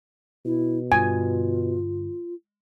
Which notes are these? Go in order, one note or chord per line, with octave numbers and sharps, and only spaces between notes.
B2 E4
G2 D3 F4 G#5